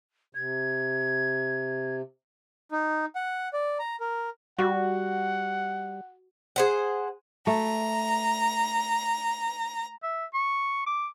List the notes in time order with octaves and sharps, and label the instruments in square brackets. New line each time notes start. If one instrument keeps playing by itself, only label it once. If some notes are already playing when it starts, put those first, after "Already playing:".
[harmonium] C3 [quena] G#6
[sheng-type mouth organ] D#4
F#5
D5
A#5
A#4
[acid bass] G3 [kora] F#4 [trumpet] F#5
[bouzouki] G#4 C5 F#5
[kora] A3 [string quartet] A#5
[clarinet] E5
C#6
D6